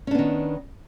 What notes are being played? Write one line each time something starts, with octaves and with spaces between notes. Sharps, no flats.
D#3 B3 C#4 D4